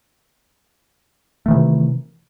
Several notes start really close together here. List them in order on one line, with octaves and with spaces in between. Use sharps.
A3 D#3 E3 C3